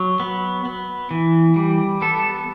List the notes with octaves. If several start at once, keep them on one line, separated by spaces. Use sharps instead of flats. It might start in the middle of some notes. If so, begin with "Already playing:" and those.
Already playing: F#3
B3
B3
E3
G3
B3 A4